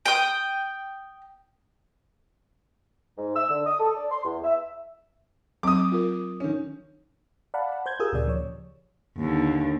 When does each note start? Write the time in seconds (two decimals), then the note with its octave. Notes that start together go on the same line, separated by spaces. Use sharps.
0.06 G5 D#6
3.18 G#2
3.36 E6
3.50 D3
3.66 D#6
3.80 A4
3.96 D5
4.11 C6
4.24 E2
4.44 E5
5.63 F#3 C4 D6 D#6
5.92 F4 A#4
6.40 D#3 C#4
7.54 D5 F5 F#5 A5 B5
7.72 F#5
7.86 C5 G6 G#6
8.00 F4 G4 G#4 A#4 D#6 E6
8.12 D2 A#2 C#3 D5
8.28 F3 C#5
9.18 D#2 D3